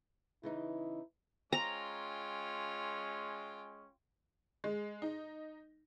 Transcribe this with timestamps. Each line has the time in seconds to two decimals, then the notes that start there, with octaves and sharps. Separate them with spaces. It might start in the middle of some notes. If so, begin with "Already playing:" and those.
0.43 C#3 E3 D#4 E4
1.52 G#3 C#4 F4 G5 A#5
4.64 G#3
5.02 D#4